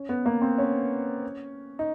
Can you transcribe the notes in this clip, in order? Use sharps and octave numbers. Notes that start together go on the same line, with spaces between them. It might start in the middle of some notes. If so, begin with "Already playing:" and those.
Already playing: C#4
B3
A#3
C4
C#4
D#4